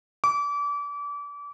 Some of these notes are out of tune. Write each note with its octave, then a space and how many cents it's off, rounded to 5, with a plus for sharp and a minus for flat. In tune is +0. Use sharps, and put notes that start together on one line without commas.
D6 -30